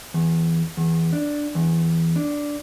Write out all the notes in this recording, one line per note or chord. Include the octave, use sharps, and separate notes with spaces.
E2
E2
D4
E2
D4